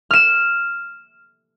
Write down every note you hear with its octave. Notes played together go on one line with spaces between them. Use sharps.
F6 E7